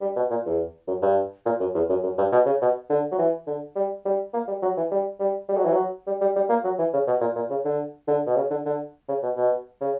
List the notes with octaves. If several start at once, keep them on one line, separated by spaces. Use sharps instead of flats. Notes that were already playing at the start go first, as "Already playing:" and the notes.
G3
B2
A#2
E2
F#2
G2
A#2
F#2
E2
F#2
F#2
G2
B2
C#3
B2
D3
F#3
E3
D3
G3
G3
A#3
G3
F#3
E3
G3
G3
G3
F#3
E3
F#3
G3
G3
G3
A#3
F#3
E3
C#3
B2
A#2
A#2
C#3
D3
D3
B2
C#3
D3
D3
C#3
B2
B2
C#3